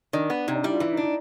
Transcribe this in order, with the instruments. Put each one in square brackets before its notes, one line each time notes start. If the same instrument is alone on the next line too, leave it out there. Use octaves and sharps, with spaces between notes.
[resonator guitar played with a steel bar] D#3 [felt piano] D4
[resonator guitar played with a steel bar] B3
[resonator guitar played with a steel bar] C3 [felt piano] D#4
[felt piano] D4
[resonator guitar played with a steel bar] G3 [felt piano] E4
[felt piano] F4
[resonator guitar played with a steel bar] E3 [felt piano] E4
[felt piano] D#4
[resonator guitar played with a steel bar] D4
[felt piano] D#4